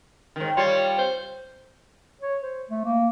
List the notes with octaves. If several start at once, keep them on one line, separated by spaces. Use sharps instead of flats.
G#2 D#3
G3 F4 C#5
C5
C#5
C5
A3
A#3